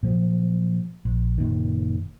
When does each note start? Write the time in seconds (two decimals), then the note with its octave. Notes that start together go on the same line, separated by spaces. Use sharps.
0.03 A#2 F3 F#3
1.05 A#1
1.38 F#1 A#2 D#3